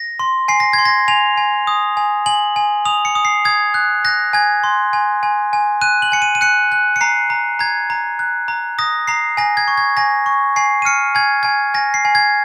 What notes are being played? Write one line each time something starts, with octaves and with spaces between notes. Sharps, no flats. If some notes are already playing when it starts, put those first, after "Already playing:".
Already playing: A#6
C6
G#5 C7
A#6
G#6
C6
A#6
G#5 F7
G#5
D#6
G#5
G#5 F#7
G#5
D#6 F7
C#7
D#6
C7
D#6 G#6
F#6
F#6 A#6
G#5 G#6
C6
G#5
G#5
G#5
F#6 D#7
F#7
G#5 C#7
D#7
D#7
F#6 C#7
F#6
C#7
A#5 C7
A#5
A#5 G#6
A#5
F#6
A#5
D#6 A#6
A#5 C7
G#5 A#6
G#6
C#6
G#6
G#5 A#6
C#6
G#5 C7
D#7
F6 C#7
G#5 G#6
G#5 G#6
G#5 A#6
C7
G#5
G#6